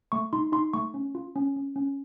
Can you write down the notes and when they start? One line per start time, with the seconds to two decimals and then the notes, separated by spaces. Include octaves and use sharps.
0.12 A3 C#6
0.33 D#4 C6
0.52 D#4 C6
0.73 A3 C#6
0.94 C#4
1.15 F4
1.36 C#4
1.56 C#4
1.76 C#4